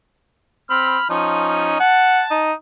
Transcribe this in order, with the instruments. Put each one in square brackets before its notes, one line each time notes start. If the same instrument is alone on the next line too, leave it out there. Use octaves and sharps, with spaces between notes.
[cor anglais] C4 [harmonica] B5 F6
[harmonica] F3 C#4 [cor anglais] D#4
[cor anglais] F#5 [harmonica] A5
[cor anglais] D#4